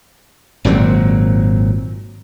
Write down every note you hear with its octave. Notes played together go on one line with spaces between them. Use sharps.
G#1 A#2 F#3 C4